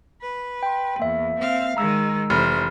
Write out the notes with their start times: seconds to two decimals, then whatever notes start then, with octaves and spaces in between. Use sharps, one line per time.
0.22 B4
0.63 G5 C6
0.99 E2 A#3 E5
1.39 C4 F5
1.77 D#3 G#3 A#5 E6
2.30 F1 E3 C5 F6